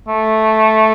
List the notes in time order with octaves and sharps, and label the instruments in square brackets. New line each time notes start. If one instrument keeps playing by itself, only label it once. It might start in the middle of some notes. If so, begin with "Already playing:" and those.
[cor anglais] A3